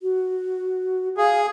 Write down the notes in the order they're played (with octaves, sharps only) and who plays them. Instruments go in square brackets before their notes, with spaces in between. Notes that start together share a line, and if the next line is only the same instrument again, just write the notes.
[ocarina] F#4
[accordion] G#4 [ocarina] F5